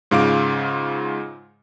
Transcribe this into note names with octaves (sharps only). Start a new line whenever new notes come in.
G#2 C#3 F4 F5 D6 D7